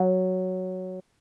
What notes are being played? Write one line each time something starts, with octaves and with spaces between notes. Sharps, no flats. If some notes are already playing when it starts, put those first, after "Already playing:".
Already playing: F#3